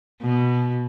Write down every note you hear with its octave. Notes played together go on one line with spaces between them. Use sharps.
B2